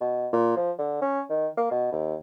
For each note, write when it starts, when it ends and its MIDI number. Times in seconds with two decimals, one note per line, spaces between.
0.01 0.28 47
0.33 0.55 46
0.57 0.72 53
0.79 0.99 50
1.02 1.21 61
1.30 1.48 51
1.57 1.67 58
1.71 1.88 47
1.93 2.16 39